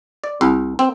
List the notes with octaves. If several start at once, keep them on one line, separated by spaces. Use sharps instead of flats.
D5
C2
C4